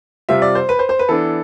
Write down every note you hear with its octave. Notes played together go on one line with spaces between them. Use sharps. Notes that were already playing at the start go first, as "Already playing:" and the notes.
C3 G3 C4 F4 E5
D5
C5
B4
C5
C5
B4
E3 B3 D4 A4